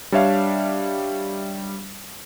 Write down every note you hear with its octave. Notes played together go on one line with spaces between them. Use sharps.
G3 D4 C#5 E5 F5